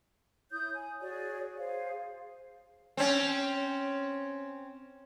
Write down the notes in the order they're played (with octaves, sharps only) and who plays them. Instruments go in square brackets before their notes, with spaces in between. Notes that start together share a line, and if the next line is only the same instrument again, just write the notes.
[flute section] E4 C#5 D#6 G6
G#5
F#4 G#4 C#5 D5
G#4 C5 F5
[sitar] C4 C#4